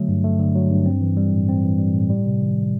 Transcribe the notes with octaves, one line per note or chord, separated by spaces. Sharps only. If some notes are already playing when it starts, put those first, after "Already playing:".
Already playing: D3 F#3 A3
G2
A3
D3
F#3
G2
C4
E3
G3
A2
C4
E3
G3
A2
G3
C3
D#3